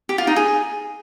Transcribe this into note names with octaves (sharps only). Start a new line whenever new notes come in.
G4
F4
D#4
G#4